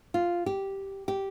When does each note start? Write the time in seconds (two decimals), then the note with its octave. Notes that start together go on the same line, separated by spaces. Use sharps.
0.14 F4
0.46 G4
1.08 G4